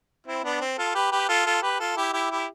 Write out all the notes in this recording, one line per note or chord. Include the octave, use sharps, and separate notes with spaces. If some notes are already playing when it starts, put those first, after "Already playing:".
C4 E4
B3 D4
C4
F4 A4
G4 B4
G4 B4
F4 A4
F4 A4
G4 B4
F4 A4
E4 G4
E4 G4
E4 G4